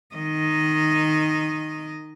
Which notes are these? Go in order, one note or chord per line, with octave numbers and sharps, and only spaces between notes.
D#3 D#5